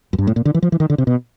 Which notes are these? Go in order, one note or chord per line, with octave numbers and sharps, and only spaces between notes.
F#2
G2
A2
A#2
D3
E3
F3
E3
D#3
D3
C3
B2